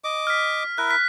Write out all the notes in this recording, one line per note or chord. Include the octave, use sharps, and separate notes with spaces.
D#5 D6
F6 B6
E4 A#4 E5 F#6
F#6 B6